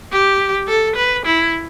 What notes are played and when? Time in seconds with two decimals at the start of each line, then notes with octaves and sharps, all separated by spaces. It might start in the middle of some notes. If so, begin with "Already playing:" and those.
0.12 G4
0.68 A4
0.96 B4
1.26 E4